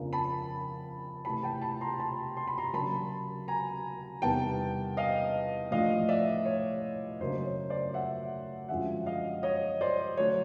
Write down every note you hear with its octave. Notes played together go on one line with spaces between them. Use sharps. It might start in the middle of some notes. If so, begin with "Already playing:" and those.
Already playing: F2 C#3 F3 A#3 D4
A5 B5
C3 E3 A3 A5 B5
G5 A5
A5 B5
A#5 C6
A5 B5
C6
B5
A#5 C6
C#3 F#3 A#3 D4 A5 B5
G#5 A#5
E2 C3 D#3 G3 B3 G5 A5
D#5 F5
A2 F3 A3 D4 D#5 F5
D5 E5
C#5
F#2 C#3 F#3 A#3 D4 C5
C#5
C5 D5
E5 F#5
F#2 D3 F3 G#3 E5 F#5
D#5 F5
C#5 D#5
C5 D5
D3 F#3 A3 D4 C#5